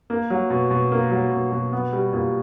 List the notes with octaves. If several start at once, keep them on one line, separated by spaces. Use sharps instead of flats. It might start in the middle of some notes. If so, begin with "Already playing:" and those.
A#3
F#3
B2
B2
A#3
F#3
B2
B2
B3
G3
A#2